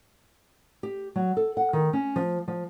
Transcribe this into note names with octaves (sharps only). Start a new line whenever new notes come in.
G4
F#3
A4
F#5
D#3
C#4
F3
F3